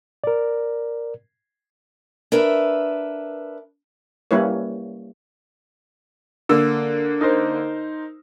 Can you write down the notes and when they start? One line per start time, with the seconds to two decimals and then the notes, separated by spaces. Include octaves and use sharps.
0.24 A#4 D5
2.32 D4 A#4 B4 E5
4.31 G3 A#3 C#4 E4 B4 C#5
6.49 D3 A#3 E6
7.21 D#4 A#4 C5